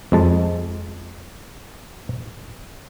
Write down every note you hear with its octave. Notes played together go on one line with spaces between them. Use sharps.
F2 G#3 A5